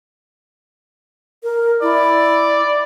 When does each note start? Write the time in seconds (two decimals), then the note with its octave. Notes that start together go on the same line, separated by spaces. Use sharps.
1.43 A#4
1.82 E4 D5